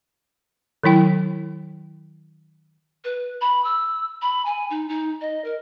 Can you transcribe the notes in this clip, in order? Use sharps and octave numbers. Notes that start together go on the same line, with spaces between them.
D#3 F#3 E4 G5
B4
B5
E6
B5
G#5
D#4
D#4
D#5
A#4